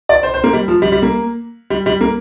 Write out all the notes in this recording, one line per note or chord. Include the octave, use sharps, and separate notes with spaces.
D5
C5
C5
A#3
G3
F3
G3
G3
A#3
G3
G3
A#3